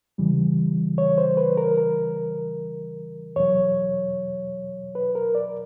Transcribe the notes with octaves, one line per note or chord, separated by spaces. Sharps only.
E2 C#3 E3 G3
C#5
C5
B4
A#4
A#4
E2 B2 F#3 C#5
B4
A#4
D5